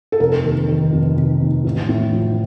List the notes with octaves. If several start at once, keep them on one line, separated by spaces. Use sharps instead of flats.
A4
F1 A#4
D#2
D#3
F1
F1
D#2
A1
A2
F3